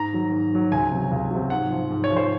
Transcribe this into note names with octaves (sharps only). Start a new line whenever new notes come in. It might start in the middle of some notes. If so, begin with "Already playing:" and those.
Already playing: G#2 A#5
D#3 F#3
G#2
D#3 F#3
C#2 G#5
C3 F#3
C#2
C3 F#3
G#2 F#5
F3
G#2
C#5
F3
C5